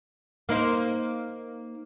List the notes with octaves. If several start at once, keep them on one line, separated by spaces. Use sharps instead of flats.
A#3 D#4 C5